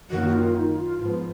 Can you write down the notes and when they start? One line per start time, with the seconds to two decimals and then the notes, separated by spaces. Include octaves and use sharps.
0.10 F#2 D#3 A#3 F#4
0.28 D#4
0.33 F4
0.55 D#4
0.77 F4
0.99 G#2 F3 B3 F4